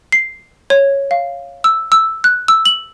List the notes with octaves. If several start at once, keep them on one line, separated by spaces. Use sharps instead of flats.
C7
C#5
F5
E6
E6
F#6
E6
F#7